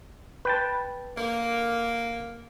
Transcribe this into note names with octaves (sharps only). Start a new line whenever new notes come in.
B4 G5 A5
D3 A#3